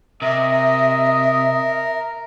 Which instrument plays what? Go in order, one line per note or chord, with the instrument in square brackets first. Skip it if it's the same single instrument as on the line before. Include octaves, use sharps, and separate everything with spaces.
[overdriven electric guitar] C3 [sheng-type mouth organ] A#4 [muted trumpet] D#5 [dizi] E5